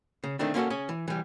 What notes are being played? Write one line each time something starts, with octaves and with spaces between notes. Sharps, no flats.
C#3
D#3 A3 C4 D4
A#3 C#4 F4 F#4 A4
C#4 G#4
E3
E3 G3